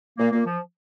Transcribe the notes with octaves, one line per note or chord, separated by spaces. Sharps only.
A#2 A#3
A#2 A#3
F3